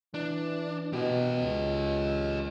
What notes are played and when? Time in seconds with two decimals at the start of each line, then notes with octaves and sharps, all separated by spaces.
0.14 E3 D4
0.93 B2 G4 D#5
1.42 C#2